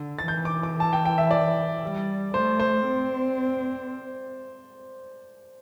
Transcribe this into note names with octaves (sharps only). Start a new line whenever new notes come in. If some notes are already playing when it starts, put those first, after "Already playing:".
Already playing: D3
A6
E3 G6
D6
D6
A5
G5
G5
E5
D5
G3
A3 C5
C5
C4